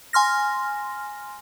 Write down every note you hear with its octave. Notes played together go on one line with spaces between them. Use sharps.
G#5 C6 F6 A#6